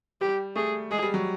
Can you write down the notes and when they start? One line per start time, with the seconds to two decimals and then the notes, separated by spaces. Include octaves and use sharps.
0.21 G3 G4
0.56 A3 G#4
0.91 G#3 G#4
1.03 G3
1.14 F#3